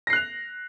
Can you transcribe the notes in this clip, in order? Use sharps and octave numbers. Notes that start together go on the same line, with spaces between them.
F#6 A#6 C7 F7